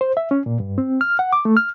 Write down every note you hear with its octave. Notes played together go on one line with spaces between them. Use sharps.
C5
E5
C#4
A#2
G2
C4
F6
F#5
D6
A3
F6